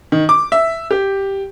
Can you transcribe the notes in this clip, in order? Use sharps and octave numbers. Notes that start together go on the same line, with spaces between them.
D#3
D6
E5
G4